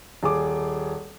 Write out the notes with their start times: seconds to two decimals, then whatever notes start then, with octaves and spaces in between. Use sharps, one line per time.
0.23 D#1 G#4 D6